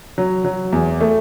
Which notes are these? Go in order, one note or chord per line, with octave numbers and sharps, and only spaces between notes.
F#3
F#3
E2
A3